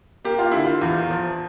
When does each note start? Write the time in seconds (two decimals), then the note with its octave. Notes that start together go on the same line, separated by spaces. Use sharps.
0.24 A#3 G4
0.39 F4
0.52 D3 E4
0.65 F4
0.82 E2
1.10 F3